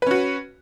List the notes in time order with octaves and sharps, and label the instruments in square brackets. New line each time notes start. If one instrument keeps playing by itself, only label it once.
[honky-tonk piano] B4
C#4
F#4